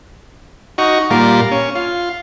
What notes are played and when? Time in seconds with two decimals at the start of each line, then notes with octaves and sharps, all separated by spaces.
0.78 D#4 F#4 C#6
1.11 A#2 G3 F4 A#4
1.51 C#4
1.75 F4